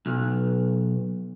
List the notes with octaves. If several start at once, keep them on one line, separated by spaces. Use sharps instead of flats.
B1